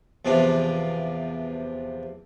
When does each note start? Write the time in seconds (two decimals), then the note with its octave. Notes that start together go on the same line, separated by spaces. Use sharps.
0.25 E2 C3 F3 D4